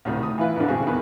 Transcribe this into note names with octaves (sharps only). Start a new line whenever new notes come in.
D2 A2 C3 D#3
D#6
E3 E4 F4 B4
F2 D3
G2 C3 C4 F#4 G#4
E2 D#3 B4